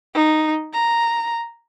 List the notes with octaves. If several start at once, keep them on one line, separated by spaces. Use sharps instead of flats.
D#4
A#5